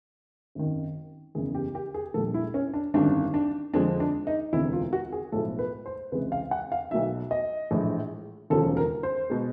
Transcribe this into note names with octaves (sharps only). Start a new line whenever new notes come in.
G#1 F#2 D#3
F#1 E2 C#3 G#4
G4
G4
G#4
A#1 A#2 G3 A4
E4
C#4
D4
G#1 F#2 D3 G3 D4
D4
F2 D3 F3 G#3 D4
D4
D#4
E1 D2 C3 E4
F4
F#4
G#4
B1 A2 F3 G#3 A4
B4
C5
C#2 C3 E3 G#3 B4
F5
F#5
F5
B1 B2 F#3 E5
D#5
A#1 A2 E3 G#3
E1 D#2 C#3 F3 A4
A#4
C5
B2 G#3